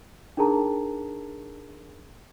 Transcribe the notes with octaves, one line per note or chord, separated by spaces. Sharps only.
D4 D#4 G#4 A#4 A5 A#5